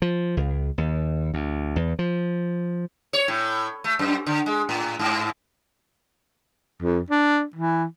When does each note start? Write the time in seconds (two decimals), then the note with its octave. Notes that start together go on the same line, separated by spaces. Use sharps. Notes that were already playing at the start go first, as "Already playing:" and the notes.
0.02 F3
0.37 C#2
0.78 D#2
1.34 D2
1.76 E2
1.99 F3
3.13 C#5
3.28 A2
3.84 A3
3.99 F#2
4.26 D3
4.46 G#3
4.69 A2
4.99 G#2
6.82 F2
7.10 D4
7.56 E3